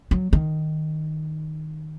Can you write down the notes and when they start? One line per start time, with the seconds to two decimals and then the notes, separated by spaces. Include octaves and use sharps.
0.11 F#3
0.33 D#3